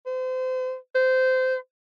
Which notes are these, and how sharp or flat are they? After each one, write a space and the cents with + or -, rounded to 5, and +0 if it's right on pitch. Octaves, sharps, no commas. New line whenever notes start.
C5 -35
C5 -20